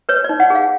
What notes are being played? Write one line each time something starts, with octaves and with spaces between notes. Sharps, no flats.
B4 C#5
D5
D#4
F#5
G#4 F5